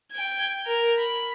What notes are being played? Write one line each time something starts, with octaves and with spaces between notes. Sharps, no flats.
G5 G#6
A#4
B5